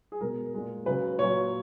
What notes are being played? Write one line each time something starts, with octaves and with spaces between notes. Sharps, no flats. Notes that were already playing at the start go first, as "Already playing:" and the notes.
G#4
B2 G#3 A#4
A#2 G#3
C#3 F#3 B4
A#2 F#3 C#5